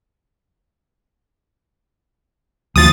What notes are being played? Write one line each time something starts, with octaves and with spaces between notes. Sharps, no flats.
D2 E3 F3 D#6 A6